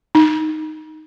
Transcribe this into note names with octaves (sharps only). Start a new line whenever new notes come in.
D#4